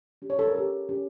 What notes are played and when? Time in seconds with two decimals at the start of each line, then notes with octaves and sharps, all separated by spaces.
0.22 C#4 G4
0.30 C#5
0.39 A4
0.48 A#4
0.55 C#4 G4 A4
0.89 C#4 G4